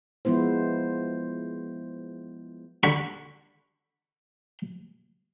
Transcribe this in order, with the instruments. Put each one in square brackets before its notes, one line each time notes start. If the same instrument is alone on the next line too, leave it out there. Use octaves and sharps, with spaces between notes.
[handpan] F3 G#3 B3 E4 C5
[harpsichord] D3 B5 C#6